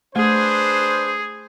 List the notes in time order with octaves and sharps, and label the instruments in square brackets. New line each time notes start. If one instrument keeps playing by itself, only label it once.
[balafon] A3 [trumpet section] D4 B4 C5 [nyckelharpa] G#4